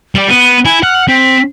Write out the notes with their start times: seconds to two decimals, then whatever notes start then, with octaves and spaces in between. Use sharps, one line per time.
0.15 G3 D5
0.30 B3 D#7
0.65 E4 G#5
0.83 F#5 F6
1.08 C4 B6